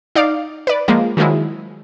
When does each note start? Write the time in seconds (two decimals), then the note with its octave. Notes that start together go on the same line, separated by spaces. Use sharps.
0.15 D#4 D5 F5 D6
0.67 B4 D5
0.88 F3 G#3 A#3
1.17 D#3 F3 F#3 G#3 E4